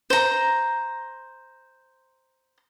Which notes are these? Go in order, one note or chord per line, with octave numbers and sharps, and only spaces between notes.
C5 A#5